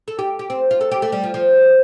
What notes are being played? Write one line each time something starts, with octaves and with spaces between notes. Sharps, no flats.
A4
G4
G4
C4
F4
A4
G4
A3
G3
F3
F3